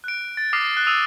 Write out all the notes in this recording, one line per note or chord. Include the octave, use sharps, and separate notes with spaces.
F#6 D7
A6
D6 D#6 F6 F#6 A#6 C7
F#6 C7
D#6 E6 D#7 F7